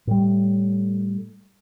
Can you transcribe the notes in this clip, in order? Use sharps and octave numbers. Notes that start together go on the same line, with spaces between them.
A2 G3